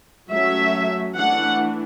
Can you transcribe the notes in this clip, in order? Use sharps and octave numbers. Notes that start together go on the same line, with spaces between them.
F#3 A3 C#4 E5
E3 A3 D4 F#5